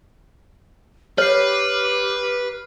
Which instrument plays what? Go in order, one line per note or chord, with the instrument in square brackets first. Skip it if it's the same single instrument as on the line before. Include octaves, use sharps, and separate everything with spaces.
[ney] G4 [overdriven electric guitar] B4 [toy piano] C#5 [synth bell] F6 C7